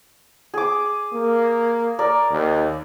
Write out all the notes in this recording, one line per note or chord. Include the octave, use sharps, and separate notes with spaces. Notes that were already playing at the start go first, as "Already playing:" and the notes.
G#4 D6
A#3
A#4 D5
D#2